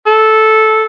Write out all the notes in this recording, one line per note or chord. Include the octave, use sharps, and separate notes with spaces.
A4